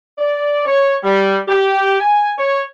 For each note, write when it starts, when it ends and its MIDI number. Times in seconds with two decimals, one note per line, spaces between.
0.18 0.62 74
0.65 0.95 73
1.03 1.37 55
1.48 1.97 67
2.00 2.30 80
2.38 2.63 73